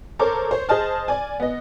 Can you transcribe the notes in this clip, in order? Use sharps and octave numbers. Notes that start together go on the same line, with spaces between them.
A4 A#4 C5 C#5 D6
C5 C#5
G#4 C5 D#5 A5 F6
D5 G#5
B3 D#5